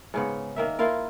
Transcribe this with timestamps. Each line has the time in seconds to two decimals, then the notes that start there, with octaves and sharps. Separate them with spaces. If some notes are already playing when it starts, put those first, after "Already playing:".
0.14 G#2 C#3 B3
0.56 D#3 A#3 E5
0.79 A#3 E4 F4 A#4